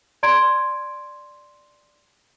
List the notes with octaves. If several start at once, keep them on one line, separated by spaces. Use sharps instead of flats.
D5 A#5 C6 G#6 D7